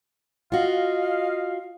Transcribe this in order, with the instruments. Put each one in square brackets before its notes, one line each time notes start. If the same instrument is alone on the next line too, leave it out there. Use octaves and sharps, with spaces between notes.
[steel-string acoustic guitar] F4 F#4 [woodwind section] D#5 F5